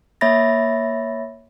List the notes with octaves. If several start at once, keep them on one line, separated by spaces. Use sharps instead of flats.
A#3 C#5 E5 B5 A6 A#6